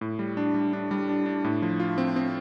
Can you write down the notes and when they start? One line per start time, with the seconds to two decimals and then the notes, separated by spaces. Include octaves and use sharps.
0.01 A2
0.19 G3
0.37 D4
0.54 G3
0.73 D4
0.91 G3
1.09 D4
1.26 D4
1.44 A2
1.62 F3
1.80 F4
1.98 C4
2.16 C4